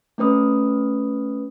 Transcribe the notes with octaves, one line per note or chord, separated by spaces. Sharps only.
A3 C#4 B4 D#6